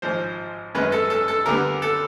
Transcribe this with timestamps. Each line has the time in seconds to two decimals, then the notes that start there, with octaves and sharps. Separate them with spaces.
0.02 G#1 G#2 F3 C5
0.75 F#2 D#3 G#3 C#4 B4
0.92 A4
1.10 A4
1.28 A4
1.46 D2 D3 G3 B3 A#4
1.82 A4